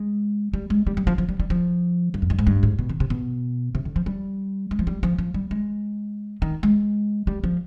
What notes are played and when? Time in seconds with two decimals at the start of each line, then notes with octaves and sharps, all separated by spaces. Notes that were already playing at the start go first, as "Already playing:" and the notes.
Already playing: G#3
0.53 G3
0.70 G#3
0.87 G3
0.97 G3
1.07 F3
1.18 F3
1.29 G3
1.40 G3
1.50 F3
2.14 G2
2.22 F2
2.30 G2
2.39 G#2
2.47 G2
2.63 G#2
2.79 B2
2.89 D#3
3.00 C3
3.10 B2
3.75 C3
3.85 D3
3.96 F3
4.06 G3
4.71 G#3
4.79 F3
4.87 G3
5.03 F3
5.19 F3
5.34 G3
5.51 G#3
6.42 D#3
6.63 G#3
7.27 G3
7.44 F3